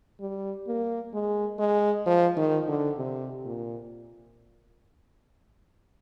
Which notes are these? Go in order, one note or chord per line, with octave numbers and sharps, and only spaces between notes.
G3
A#3
G#3
G#3
F3
D#3
D3
C3
A#2